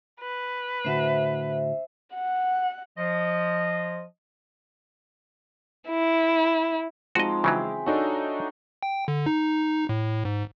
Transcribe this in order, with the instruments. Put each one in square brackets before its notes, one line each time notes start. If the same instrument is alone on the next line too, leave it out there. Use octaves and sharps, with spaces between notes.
[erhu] B4
[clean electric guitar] A2 D3 F#4 [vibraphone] C5 E5
[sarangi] F#5
[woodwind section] F3 D#5
[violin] E4
[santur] F3 C4 D#4 [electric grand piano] G#3 [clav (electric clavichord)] F#4 D#5
[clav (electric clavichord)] C#3 E3 F#3 [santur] G#4 E5 G5
[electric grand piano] D4 D#4 F#4 [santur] A4 C#5
[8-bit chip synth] G5
D3
D#4
A2
G#2